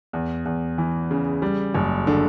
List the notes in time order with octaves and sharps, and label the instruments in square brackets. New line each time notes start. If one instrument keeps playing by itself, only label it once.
[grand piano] E2
E2
E3
C#3
G3
F#1
D3